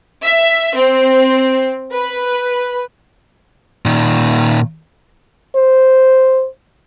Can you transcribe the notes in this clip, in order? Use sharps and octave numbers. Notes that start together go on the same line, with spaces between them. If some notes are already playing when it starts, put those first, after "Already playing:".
E5
C4
B4
A#2 D#3
C5